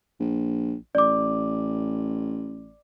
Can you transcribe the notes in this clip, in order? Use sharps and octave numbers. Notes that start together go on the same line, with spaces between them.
A#1
A1 D5 D6